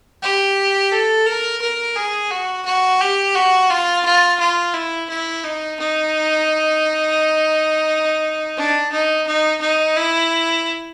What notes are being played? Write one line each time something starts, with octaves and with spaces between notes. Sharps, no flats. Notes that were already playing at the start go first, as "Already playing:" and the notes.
G4
A4
A#4
A#4
G#4
F#4
F#4
G4
F#4
F4
F4
F4
E4
E4
D#4
D#4
D4
D#4
D#4
D#4
E4